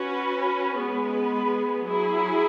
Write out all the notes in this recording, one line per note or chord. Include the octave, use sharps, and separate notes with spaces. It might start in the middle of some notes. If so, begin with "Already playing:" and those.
Already playing: C#4 F#4 B4
G#3 B3 G#4 B4
F#3 E4 G#4